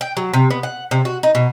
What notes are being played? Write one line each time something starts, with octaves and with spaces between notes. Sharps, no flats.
G5
F#3
C3
B3
F#5
C3
F#4
D#4
B2